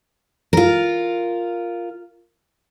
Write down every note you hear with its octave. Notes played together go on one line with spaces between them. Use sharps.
F4 A#4